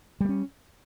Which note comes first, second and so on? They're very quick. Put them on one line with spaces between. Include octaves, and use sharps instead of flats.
G3 A3 C#4